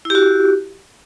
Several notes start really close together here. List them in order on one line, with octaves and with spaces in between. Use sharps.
E4 G4 F#4